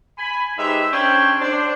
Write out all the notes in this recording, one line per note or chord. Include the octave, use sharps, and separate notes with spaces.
G#5 B5
G#3 D#4 G4 B4 C5 E5
C#4 D4 C5 C#5 G5
D4 C5